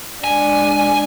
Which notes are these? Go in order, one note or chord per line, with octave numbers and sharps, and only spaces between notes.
G#3 D4 G#5